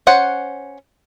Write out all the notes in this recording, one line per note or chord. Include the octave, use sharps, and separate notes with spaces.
C#4 C5 F#5